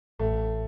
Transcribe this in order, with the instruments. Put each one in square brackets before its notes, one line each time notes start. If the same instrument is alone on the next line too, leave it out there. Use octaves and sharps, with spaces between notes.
[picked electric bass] A1 [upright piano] A3